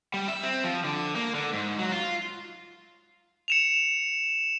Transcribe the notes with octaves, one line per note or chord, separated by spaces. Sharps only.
G3
E5
C4
F3
D3
A#3
D3
G#2
F#3
F4
C#7 E7 F7